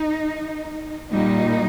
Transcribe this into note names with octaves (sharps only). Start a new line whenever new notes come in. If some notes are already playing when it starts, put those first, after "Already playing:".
Already playing: D#4
A#2 G3 D#4